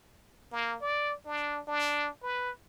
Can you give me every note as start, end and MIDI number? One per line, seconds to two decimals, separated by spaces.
0.52 0.76 58
0.82 1.14 74
1.26 1.60 62
1.67 2.09 62
2.23 2.51 71